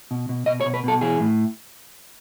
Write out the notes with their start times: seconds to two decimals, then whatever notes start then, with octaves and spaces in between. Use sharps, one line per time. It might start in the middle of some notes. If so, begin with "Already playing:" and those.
0.11 B2
0.29 B2
0.46 B2 D#5
0.61 C#5
0.66 B2
0.74 B4
0.84 B2 A4
1.01 E3 G#4
1.20 A2